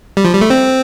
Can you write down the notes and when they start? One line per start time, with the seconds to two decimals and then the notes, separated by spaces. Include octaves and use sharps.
0.17 G3
0.24 F3
0.33 G3
0.41 A3
0.50 C4